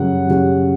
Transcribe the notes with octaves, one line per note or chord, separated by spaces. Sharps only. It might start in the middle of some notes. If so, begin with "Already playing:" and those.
Already playing: F#2 C#3 G3 C#4 F#5
F#2 C#3 G3 C#4